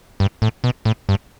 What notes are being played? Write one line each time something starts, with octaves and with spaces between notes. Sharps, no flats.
G2
A2
B2
A2
G2